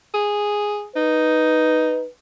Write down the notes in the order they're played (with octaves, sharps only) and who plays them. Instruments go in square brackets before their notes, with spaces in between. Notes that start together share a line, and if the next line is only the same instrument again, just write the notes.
[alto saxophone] G#4
[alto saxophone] D#4 [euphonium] B4